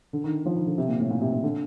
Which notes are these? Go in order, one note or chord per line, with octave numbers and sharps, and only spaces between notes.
D3
D#3
F3
D#3
D3
C3
A#2
A2
A#2
C3
C3
D3